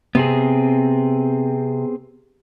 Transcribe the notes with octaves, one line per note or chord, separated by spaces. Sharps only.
C3 B3 C4 G#4